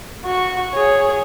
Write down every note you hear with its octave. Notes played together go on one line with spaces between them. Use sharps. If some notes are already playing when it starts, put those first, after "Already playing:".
F#4 C#6
G#4 C#5